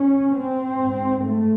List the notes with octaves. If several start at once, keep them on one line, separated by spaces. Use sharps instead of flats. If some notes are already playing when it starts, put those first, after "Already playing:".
Already playing: C#4
C4
G#2
A3